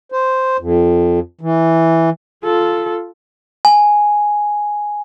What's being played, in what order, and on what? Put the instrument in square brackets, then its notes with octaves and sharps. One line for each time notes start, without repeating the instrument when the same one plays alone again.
[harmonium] C5
F2
E3
[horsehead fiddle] F4 A4
[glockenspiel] G#5